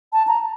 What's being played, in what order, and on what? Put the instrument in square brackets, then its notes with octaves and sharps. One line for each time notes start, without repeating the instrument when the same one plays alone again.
[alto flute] A5
A#5